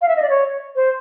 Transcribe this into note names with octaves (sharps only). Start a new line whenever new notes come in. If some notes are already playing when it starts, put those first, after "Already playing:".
F5
E5
D#5
D5
C#5
C5